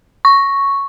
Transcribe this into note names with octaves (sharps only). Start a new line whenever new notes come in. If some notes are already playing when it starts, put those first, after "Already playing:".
C#6